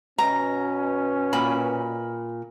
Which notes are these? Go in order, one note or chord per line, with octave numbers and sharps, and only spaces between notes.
B2 C#4 A#5
A#2 B5